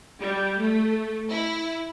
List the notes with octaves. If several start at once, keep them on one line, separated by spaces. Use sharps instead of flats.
G3
A3
E4